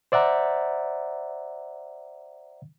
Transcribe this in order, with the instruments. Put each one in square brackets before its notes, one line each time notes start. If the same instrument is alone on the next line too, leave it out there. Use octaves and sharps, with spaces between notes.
[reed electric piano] C5 D5 E5 F#5 A#5